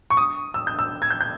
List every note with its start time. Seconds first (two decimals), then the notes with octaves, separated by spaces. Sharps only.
0.10 C#6
0.17 D#6
0.54 E6
0.67 G6
0.79 E6
1.02 G#6
1.10 G6
1.21 G6